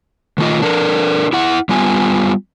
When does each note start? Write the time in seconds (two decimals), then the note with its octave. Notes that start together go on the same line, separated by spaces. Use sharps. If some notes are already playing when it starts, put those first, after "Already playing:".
0.38 D#3 A3 F4 D#5
0.62 D4 A4 A#4
1.33 E4 F#5
1.69 G3 B3 F4 G#5